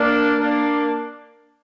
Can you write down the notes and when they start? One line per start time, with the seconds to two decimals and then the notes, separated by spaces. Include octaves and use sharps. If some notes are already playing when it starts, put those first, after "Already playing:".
Already playing: A#3 D4
0.40 A#3 D4